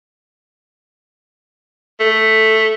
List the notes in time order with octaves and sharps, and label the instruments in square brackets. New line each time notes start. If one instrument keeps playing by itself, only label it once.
[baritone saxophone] A3